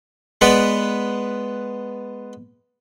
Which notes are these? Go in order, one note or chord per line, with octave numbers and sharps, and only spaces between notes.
G#3 B3 B4 D5 F#5